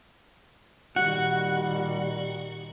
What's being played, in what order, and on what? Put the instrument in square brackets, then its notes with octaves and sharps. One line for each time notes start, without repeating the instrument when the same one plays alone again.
[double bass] A#2 D#3 [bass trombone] G3 [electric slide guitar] F#4 [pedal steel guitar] F#5